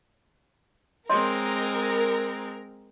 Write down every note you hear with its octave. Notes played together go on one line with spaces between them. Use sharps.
G#3 C4 A#4 C#5 D#5 C6